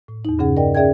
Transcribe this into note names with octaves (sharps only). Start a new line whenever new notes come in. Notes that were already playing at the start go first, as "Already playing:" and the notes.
A2
E2 D#4
G2 C#3 C#4 G#4 F#5
A#4 D5 D#5 G5
C#4 G#4 D5 E5 G5 G#6